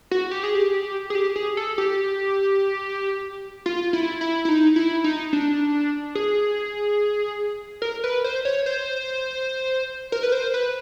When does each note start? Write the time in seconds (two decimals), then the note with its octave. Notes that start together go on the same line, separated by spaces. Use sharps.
0.11 F#4
0.31 G4
0.43 G#4
0.55 G4
1.10 G#4
1.15 G4
1.36 G#4
1.57 A4
1.78 G4
3.66 F4
3.93 E4
4.21 E4
4.45 E4
4.49 D#4
4.76 E4
5.04 D#4
5.33 D4
6.15 G#4
7.82 A#4
8.04 B4
8.24 C5
8.45 C#5
8.66 C5
10.12 A#4
10.23 B4
10.32 C5
10.54 B4